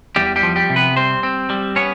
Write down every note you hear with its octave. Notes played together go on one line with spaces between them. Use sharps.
E2 G3 G4
G3 G4
F3
G3 G4
C3
B3 B4
G3 C4 C5
C4
G3
B3 C#4 C#5